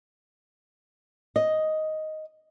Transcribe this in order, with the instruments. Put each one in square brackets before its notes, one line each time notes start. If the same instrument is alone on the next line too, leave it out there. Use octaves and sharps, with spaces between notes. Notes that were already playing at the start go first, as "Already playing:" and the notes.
[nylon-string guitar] D#5